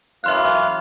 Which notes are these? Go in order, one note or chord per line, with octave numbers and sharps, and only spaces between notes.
F#2 E3 E5 F5 C6 F#6